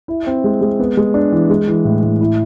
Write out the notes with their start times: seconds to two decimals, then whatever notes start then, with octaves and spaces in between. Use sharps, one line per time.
0.08 E4
0.27 C4
0.44 G#3
0.61 G#3
0.79 B3
0.97 G#3
1.14 D4
1.32 E3
1.50 G#3
1.68 E3
1.85 A2
2.03 A2
2.21 E4